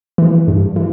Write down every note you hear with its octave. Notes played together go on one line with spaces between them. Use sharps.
E3
G2
E3